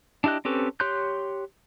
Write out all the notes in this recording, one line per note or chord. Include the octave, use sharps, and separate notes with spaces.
D4 E4 G4 D#5 F#6
C4 C#4 G4 A4 B4
G4 C#5 C6 F#6 G6